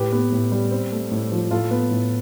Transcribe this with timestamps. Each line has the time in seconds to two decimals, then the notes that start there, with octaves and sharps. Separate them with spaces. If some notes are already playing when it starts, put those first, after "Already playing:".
Already playing: A2 G4 B4
0.12 B3
0.32 A2
0.52 G3
0.71 C4
0.92 A3
1.11 A2
1.32 F3
1.51 A2 F4 A4
1.71 B3
1.91 A2